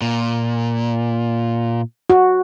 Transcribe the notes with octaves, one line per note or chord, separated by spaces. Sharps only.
A#2
F#4